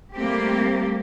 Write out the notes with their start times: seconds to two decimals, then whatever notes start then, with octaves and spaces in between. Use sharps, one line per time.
0.17 G3 A3 A#3 C4 G4